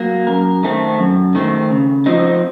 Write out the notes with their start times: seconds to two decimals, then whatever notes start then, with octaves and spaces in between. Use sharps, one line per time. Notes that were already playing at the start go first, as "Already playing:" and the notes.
Already playing: F#3 A#3
0.27 F#2 A#4
0.63 D#3 A3 C4
0.99 F#2
1.35 D#3 A3 C4
1.70 C#3
2.06 F3 C4 D#4